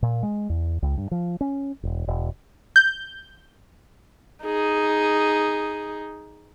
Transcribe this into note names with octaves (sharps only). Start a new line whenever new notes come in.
A#2
G#3
E2
C#2
G2
F3
C#4
E1
E1
G6
D#4 G#4